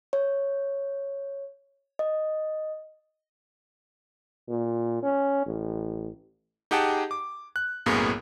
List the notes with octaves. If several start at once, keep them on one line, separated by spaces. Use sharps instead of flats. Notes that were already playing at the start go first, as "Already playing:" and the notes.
C#5
D#5
A#2
C#4
A1
D#4 G4 G#4 F#5 G5 A5
D6
F#6
B1 F#2 A2 A#3 B3 G#4